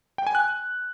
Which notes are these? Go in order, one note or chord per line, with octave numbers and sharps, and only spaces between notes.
G5
G#5
F#6